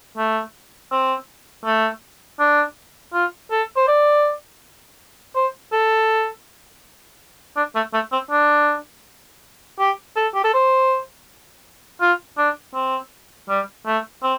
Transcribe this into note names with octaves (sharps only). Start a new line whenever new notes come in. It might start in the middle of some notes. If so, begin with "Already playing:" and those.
A3
C4
A3
D4
F4
A4
C5
D5
C5
A4
D4
A3
A3
C4
D4
G4
A4
G4
A4
C5
F4
D4
C4
G3
A3
C4